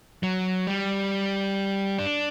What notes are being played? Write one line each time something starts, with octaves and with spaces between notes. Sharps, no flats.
F#3
G3
D4